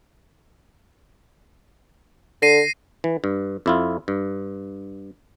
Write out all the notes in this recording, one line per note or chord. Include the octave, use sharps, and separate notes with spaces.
D3 A#6 C7 D#7
E3
G2
F2 E4 F4
G2